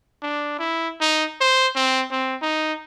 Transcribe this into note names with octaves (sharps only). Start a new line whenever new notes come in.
D4
E4
D#4
C5
C4
C4
D#4